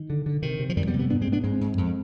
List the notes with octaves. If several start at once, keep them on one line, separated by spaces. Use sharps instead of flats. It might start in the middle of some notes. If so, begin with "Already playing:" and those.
Already playing: D#3
D3
D3
C3 D#3
C3
F3
F2 D#3 G3
G3 B3
C3
G3 B3
G#2 B3 D4
G#3 C4
G#2
B3 D4
G#2 G#3 C4
G#2
F2